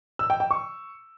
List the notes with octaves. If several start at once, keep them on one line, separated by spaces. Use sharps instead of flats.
E6
G5
G5
C#6